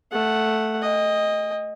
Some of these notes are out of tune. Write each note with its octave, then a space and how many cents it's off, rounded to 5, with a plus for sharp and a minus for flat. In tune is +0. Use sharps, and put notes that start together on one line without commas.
A3 +0 F#5 +0
D#5 +0 G5 +45